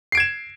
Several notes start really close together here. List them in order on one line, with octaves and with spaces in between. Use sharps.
C7 D7 G#6 E7